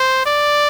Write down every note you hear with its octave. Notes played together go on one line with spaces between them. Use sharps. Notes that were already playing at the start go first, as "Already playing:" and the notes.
Already playing: C5
D5